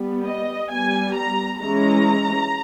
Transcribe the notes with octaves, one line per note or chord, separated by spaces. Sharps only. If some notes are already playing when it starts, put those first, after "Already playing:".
Already playing: G3 B3
D#5
G3 B3 G#5
A#5
E3 G#3 C#4 A#5